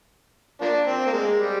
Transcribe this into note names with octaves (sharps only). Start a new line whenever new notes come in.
F3 A#3 D4
C4
A#3
G#3
G3